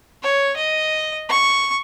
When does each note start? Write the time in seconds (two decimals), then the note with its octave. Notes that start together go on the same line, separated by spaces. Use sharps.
0.23 C#5
0.56 D#5
1.29 C#6